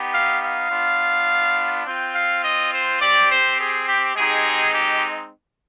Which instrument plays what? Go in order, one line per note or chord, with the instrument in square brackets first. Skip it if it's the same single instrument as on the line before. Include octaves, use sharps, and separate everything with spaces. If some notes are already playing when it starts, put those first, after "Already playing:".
Already playing: [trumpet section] B3 D#4 G4
F5
F5
B3 D4 F4
C4 F4 G5
F5
D#5
C5
C4 G4 D5
C5
G#4
G4
G#3 C4 D#4 G4 G#4
G4